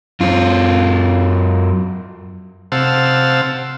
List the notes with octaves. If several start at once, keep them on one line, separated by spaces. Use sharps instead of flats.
F#2 F4
C3 C5 F5 F#5 A5 E6